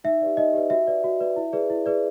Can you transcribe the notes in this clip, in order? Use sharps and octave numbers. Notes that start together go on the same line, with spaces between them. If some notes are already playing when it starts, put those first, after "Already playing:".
D#4 E5
G4 B4 D5
D#4 D#5
G4 B4 D5
F#4 E5
B4 D5
F#4
B4 D5
E4
G#4 B4 D5
E4
G#4 B4 D5